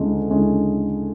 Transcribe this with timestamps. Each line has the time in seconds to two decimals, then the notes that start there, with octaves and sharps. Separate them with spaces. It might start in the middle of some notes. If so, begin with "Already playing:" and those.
Already playing: D2 C#3 G#3 C#4 E4
0.30 D2 C#3 G#3 C#4 E4